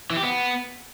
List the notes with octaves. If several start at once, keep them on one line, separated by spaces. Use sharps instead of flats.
E3
G4
B3